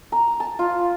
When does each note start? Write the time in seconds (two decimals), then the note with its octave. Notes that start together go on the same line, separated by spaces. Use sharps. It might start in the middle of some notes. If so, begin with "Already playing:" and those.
0.12 A#5
0.40 A5
0.59 F4